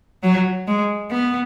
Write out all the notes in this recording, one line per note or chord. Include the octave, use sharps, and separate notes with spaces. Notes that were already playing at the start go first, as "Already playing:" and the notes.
F#3
G#3
B3